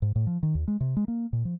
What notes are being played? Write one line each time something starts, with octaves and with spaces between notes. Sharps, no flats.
G#2
A2
F3
D#3
D#2
G#3
C3
G#3
A#3
A#2
F3